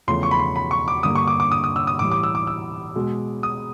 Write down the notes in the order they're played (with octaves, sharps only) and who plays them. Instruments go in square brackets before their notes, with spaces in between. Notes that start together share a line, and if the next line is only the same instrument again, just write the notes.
[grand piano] E2 C#3 F3 A3 C6
C#6
B5
C6
B5
C#6
D6
G2 D3 G3 A#3 D#6
C#6
D6
D6
D#6
D#6
E6
D#6
A2 E3 G3 D6
D6
E6
D6
E6
B2 G#3
D#6